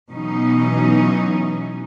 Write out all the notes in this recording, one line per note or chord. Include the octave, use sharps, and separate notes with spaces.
B2 E3 F#3 C#4 D#4